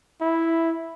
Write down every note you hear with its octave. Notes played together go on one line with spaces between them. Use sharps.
E4